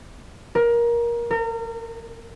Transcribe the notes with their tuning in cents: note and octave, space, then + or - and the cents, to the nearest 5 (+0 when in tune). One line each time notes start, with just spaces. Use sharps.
A#4 +20
A#4 -35